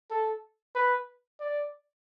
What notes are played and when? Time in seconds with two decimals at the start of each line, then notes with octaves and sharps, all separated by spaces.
0.11 A4
0.75 B4
1.40 D5